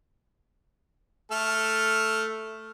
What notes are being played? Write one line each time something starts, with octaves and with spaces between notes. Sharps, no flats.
A3 A4 F6